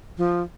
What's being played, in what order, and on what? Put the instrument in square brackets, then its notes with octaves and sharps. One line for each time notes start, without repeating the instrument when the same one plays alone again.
[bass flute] F3